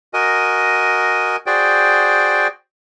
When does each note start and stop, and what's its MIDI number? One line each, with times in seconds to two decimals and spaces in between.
0.14 1.36 66
0.14 1.36 70
0.14 1.36 75
0.14 1.36 80
1.46 2.47 66
1.46 2.47 68
1.46 2.47 72
1.46 2.47 74
1.46 2.47 79